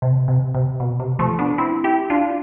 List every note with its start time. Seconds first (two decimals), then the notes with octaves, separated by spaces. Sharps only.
0.02 C3
0.28 C3
0.55 C3
0.80 B2
1.00 C3
1.19 F3 A3
1.39 B3 D4
1.58 C4 E4
1.84 E4 G4
2.10 D4 F4